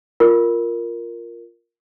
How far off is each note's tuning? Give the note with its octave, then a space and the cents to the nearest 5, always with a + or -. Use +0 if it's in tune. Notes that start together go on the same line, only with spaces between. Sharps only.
F4 +0 A#4 +0